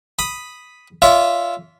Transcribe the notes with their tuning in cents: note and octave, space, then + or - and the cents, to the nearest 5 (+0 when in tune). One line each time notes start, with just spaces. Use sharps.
B5 +0 D#6 +0
F4 -10 C#5 +45 E5 +0